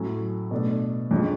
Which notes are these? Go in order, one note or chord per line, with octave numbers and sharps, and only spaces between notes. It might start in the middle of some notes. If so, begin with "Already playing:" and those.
Already playing: A2 F#3 C#4
B2 A3 D4
F2 D3 G#3 C#4